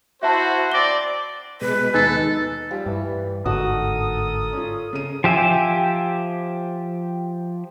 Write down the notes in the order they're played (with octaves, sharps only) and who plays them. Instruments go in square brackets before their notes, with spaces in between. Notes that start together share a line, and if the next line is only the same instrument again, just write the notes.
[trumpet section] E4 F#4 C5 [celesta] E5 A5
[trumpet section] C4 D5 [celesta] A#6 G7
[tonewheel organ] B2 G#3 [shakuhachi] B4
[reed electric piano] D#2 D#4 G#5 [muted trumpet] A4
[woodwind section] F3 [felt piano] G3
[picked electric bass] G2 [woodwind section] E3
[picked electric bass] G1 G#2 D3 [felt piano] F#4 [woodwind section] A4 A#4 D#6
[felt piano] C#4 F4
C#3 D#7
[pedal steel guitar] F3 G4 E5 G5 G#5